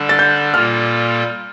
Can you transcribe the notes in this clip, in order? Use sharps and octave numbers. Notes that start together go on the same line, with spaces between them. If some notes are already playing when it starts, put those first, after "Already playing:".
Already playing: D3 G3 D4 A4
A6
G6
A#2 G3 A#3 F4 A4 F6